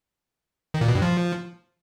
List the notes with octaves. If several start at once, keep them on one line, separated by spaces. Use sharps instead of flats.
D#3
A#2
B2
G2
F3